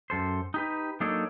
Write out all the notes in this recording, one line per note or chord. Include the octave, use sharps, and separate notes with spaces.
F#2 A4 C5
D#4 G4 B4
F#3 A#3 D4 D#4 A4 C#5